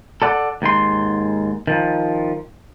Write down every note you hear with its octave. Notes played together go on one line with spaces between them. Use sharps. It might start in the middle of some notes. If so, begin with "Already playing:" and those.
A4 D5 F#5
D#2 G#2 C6
D#3 F3